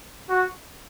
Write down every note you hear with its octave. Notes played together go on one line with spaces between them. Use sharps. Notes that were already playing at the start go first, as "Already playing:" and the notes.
F#4